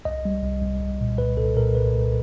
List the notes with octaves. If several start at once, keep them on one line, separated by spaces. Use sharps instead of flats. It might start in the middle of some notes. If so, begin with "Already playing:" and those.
C2 D#5
G3
C2
C2
C2
A#2
C2 B4
C2 A4
A#2 A#4
C2 B4
C2